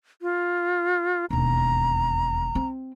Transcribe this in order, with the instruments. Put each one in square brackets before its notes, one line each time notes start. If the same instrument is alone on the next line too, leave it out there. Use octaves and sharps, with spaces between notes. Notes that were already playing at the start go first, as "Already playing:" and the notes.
[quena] F4
[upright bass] E1 D#2 [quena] A#5
[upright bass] C4